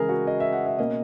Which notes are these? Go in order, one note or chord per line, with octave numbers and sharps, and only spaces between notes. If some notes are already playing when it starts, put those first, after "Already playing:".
Already playing: C#3 E3 G#3 G#4 A#4
F#4
D#5
E5
F#5
E5
B2 A#3 C#4 D#5